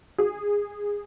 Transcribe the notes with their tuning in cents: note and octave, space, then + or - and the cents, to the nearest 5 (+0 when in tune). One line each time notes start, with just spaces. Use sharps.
G#4 -15